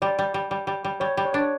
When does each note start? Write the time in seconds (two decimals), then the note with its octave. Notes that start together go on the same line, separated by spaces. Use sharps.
0.02 G3 D5
0.19 G3
0.34 G3
0.51 G3
0.67 G3
0.84 G3
1.00 G3 C#5
1.17 G3
1.25 C#5
1.33 D4 D5
1.40 C#5